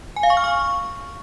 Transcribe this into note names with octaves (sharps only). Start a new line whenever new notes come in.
G#5
F5
C#6
F6
C#6